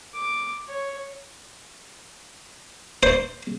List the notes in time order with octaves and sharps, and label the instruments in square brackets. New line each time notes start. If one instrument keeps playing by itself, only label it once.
[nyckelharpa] D6
C#5
[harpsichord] C5